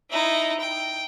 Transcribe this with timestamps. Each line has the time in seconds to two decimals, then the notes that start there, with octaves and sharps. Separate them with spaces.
0.10 D#4 E4
0.60 G5